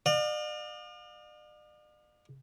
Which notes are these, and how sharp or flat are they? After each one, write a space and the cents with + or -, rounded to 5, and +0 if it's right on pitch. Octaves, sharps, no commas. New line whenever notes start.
D5 +45 F5 +35